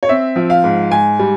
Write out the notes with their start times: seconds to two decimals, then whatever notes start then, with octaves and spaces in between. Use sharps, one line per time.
0.03 C#5
0.09 C4 E5
0.36 F3
0.50 F5
0.64 G#2
0.91 G#2 G#5
1.19 G3